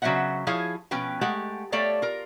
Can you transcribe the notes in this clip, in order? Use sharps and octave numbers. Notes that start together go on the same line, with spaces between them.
C#3 F#3 D#4 C5 E5 F#5
F3 E4 G#4 C#5 F5
B2 F3 C#4 B4 G5
G#3 A3 G4 F#5
A3 G4 A4 C#5 D5 F5
F4 A#4